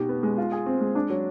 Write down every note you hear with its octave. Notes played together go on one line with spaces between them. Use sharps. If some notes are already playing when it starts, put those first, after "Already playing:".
Already playing: B2 D#4 G4
B3
G#3
F4
G#4
C4
G#3
D4
F#3